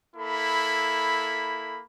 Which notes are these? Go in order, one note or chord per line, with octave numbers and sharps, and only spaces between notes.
A#3 E4 A4 B5